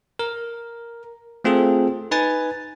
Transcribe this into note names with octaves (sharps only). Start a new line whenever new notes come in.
A#4
A3 C4 F4 G#4 A4
D#4 B4 G#5 A6